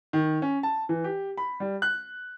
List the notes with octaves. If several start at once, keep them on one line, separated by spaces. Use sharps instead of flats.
D#3
C#4
A5
E3
G4
B5
G3
F#6